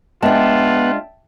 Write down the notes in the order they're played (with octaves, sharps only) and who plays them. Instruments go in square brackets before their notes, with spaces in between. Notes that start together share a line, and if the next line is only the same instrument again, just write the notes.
[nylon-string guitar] G#3 D4 [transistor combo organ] B3 F#5 [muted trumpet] F4 [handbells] E5 G5 A5